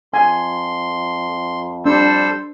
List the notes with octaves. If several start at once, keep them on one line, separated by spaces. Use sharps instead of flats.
F2 G#5 C6
G3 D4 A4 C5 E6